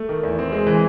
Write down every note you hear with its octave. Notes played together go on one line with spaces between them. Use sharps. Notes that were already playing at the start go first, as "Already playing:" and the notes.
Already playing: A3
D#3
E2
C4
G#3
E3